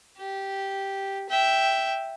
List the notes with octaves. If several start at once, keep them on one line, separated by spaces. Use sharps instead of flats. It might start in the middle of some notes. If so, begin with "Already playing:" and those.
G4
E5 G5